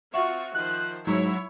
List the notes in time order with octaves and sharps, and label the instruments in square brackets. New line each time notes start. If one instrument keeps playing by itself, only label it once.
[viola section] C4 F4 F#4 [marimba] E5 F#5 [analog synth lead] C#6
[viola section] D#3 F3 C5 [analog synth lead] F#6
[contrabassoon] G#2 [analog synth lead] F#3 [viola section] E4 C#5